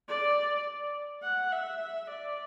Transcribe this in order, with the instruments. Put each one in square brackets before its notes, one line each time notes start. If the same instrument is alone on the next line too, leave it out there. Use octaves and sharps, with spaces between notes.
[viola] D5
F#5
E5
D5